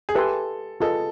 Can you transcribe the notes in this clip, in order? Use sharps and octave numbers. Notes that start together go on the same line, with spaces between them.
G#4
G4 A4 B4 E5 G#5 C6
F4 G#4 A4 B4 D#5